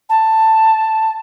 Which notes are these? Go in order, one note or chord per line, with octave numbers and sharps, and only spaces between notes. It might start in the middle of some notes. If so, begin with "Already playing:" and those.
A5